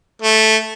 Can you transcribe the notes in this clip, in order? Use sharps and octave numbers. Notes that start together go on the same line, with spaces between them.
A3